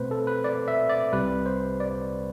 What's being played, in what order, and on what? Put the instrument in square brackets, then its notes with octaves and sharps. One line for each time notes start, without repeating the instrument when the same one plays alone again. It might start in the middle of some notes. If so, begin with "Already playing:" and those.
Already playing: [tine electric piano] B2 A3 C4 B4 C5
A4
B4
D5
E5
D5
C2 C3 G3 B4
C5
D5